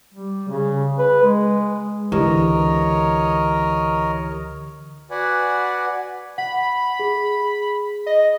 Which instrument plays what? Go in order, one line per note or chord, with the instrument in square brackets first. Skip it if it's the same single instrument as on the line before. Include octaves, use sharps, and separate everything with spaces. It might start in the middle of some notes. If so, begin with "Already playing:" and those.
[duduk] G3
C#3
B4
G#3
[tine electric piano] C#2 E3 G4 [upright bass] D3 [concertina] A#4 C#5 D#5
[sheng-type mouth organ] F#4 B4 D5 F#5 G#5
[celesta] F#5 [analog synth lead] B5
[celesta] G#4
[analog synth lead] D#5